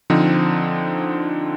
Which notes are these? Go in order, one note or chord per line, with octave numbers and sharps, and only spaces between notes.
D3 F3 C4 D#4